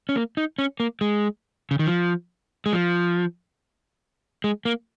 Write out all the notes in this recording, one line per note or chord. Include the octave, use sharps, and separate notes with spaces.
C#4
A#3
D#4
C#4
A#3
G#3
C#3
D#3
F3
G#3
F3
G#3
A#3